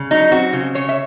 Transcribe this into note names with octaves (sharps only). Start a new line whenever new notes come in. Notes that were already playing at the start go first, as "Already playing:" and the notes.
Already playing: C#3
F#3 D#4
C4 F#4
C#3
C#3 C#5
E5